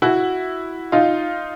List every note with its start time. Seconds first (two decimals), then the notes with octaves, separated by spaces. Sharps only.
0.02 E4 F#4
0.92 D#4 F4